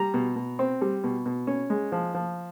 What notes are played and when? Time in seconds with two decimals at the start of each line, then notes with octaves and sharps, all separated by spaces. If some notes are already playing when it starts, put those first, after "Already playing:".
Already playing: G3 A#5
0.14 B2
0.36 B2
0.59 C4
0.81 G3
1.04 B2
1.26 B2
1.47 C#4
1.70 G#3
1.92 F3
2.15 F3